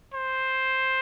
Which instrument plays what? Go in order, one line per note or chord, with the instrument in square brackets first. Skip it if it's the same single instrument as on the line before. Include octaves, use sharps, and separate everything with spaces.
[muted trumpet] C5